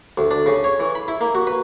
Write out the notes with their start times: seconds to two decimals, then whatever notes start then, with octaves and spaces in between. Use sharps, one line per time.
0.18 D2
0.31 D4
0.46 C#3
0.64 C#5
0.80 E3
0.95 B5
1.08 E4
1.21 A#3
1.35 F#4
1.47 B4